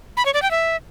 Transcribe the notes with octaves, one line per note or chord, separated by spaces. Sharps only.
B5
C#5
D5
G5
E5